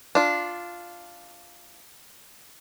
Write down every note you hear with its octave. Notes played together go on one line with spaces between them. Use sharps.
D4 F4